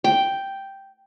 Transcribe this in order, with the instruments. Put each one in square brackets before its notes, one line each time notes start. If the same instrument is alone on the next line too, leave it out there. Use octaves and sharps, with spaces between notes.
[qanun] G5